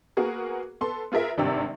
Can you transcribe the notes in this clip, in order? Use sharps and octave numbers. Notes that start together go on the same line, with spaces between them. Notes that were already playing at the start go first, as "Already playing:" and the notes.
A#3 B3 F#4 G#4 A#4
B3 A4 C6
B3 F4 G#4 A#4 E5
G#1 G2 C3 G4 D5 E6